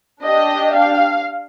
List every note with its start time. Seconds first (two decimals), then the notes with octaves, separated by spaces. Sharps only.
0.23 D4 G4 D#5
0.74 F5